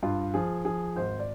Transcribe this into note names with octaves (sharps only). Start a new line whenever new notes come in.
G2 F4
F3 G#4
F3 G#4
G#1 C5
D5